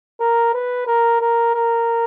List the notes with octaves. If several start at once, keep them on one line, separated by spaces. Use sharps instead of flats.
A#4
B4
A#4
A#4
A#4